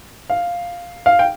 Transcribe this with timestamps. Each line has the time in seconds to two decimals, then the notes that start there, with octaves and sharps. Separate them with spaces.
0.30 F5
1.06 F5
1.19 G5